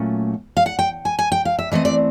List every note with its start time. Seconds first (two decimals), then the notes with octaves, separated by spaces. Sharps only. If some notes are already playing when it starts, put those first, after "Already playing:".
Already playing: A#2 F#3 A3 C#4
0.57 F5
0.66 F#5
0.79 G5
1.05 G#5
1.19 G#5
1.32 G5
1.45 F5
1.59 E5
1.72 E3 A3 C4 D#5
1.85 D5